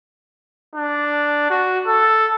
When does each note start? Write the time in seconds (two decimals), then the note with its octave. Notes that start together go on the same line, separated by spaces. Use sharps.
0.76 D4
1.50 F#4
1.87 A4